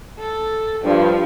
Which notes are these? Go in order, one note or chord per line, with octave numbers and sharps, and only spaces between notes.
A4
G2 F3